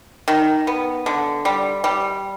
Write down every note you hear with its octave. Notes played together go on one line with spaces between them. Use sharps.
D#3
B3
D3
G3
G3